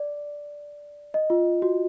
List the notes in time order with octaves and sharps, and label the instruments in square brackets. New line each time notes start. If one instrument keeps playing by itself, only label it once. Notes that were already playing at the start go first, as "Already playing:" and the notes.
Already playing: [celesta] D5
D#5
F4
F#4